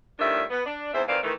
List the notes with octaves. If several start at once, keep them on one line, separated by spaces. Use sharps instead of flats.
A2 D#3 F3 G3 D4 E5
B3
D4
E2 G#2 C4 C5 E5
D#3 E3 C4 D5 F5
D#3 E3 A3